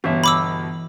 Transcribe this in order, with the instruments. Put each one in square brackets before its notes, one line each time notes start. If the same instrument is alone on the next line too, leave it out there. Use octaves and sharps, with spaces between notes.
[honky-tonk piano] G1 B2 [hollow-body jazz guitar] E3 E5
[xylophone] B5 D6 E6